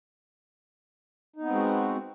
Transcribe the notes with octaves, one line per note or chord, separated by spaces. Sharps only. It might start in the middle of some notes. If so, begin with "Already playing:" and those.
G#3 B3 C4 D#4 F#4